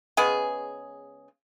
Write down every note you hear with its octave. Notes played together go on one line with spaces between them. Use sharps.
C#3 G#3 B3 G#4